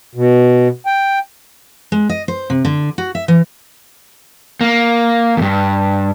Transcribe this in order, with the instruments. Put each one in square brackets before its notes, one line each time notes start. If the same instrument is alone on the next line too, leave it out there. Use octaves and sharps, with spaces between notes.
[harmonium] B2
G5
[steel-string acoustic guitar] G#3
D#5
C5
C3
D3
F#4
E5
E3
[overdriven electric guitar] A#3
E2 G2